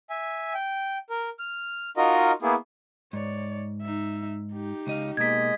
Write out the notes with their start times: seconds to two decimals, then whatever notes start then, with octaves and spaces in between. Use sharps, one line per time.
0.10 E5 G#5
0.54 G5
1.10 A#4
1.39 F6
1.97 D#4 F4 F#4 A#4 D#5
2.42 A#3 B3 E4 G#4
3.13 G#2 C#5 D5
3.82 D#4 E5
4.52 D#4 G4
4.87 C#2 D#5 F5
5.17 B2 G#3 A#3 D#5 G#6 B6